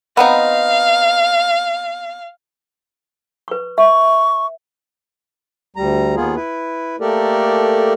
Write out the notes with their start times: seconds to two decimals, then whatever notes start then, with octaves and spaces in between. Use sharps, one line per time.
0.17 B3 C4 D#4 F5
3.48 B4 C#6
3.78 E5 C#6
5.76 D2 G3 A#5
6.16 D#2 A#3 B3 F4 G#4
6.36 E4 B4
7.00 A3 A#3 G4 A4 A#4 D5